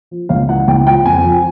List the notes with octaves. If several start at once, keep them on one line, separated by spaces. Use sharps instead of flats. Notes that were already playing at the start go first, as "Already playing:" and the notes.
F3
C#2 F5
E3 F#5
C#2 G5
F3 G5
F2 G#5
F3